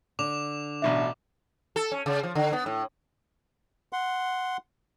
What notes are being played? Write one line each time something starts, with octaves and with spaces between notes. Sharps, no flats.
D3 D6 F7
A1 B2 D4 E5
A4
C#4
C#3
F3
D3
B3
A2
F#5 C6